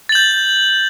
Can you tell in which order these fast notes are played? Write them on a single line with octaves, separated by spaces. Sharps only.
A6 F#7 G6